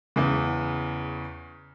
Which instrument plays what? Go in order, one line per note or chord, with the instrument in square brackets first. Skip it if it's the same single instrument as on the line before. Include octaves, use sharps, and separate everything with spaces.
[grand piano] E2 C#3